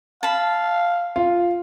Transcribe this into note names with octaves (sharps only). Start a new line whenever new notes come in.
F5 A5 B5
F4